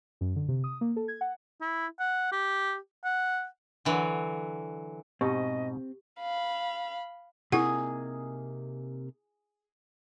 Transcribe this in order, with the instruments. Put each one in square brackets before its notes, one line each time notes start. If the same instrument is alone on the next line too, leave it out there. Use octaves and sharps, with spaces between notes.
[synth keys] F#2
D3
C3
D#6
A#3
A4
G#6
F#5
[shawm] E4
F#5
G4
F#5
[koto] D3 E3 F#3
[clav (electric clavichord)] G#2 B2 [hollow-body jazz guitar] C4 [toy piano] G4 [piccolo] D#5
[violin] F5 B5
[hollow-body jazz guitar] C3 A#3 D#4 [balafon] E4 F#5 [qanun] G#4